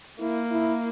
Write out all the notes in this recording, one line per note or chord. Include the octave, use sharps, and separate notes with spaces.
A#3 E4
E4